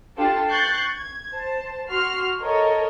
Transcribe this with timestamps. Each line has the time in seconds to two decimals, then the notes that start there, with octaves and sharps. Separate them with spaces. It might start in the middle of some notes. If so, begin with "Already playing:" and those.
0.17 D4 F4 G4 A4 G5 A5
0.48 C#6 F#6 G6 A6 C7
0.95 G#6
1.31 C5 A5
1.89 F#4 C6 F6 C7
2.42 A4 A#4 C#5 D#5